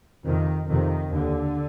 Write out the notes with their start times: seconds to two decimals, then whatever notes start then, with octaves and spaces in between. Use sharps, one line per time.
0.25 F2 C3 D#3
0.68 F2 C3 D#3
1.11 D#2 D3